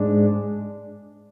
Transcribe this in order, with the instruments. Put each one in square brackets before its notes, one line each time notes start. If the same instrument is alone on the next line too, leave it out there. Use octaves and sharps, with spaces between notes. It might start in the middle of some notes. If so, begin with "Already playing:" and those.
Already playing: [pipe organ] G#2 G#3 D4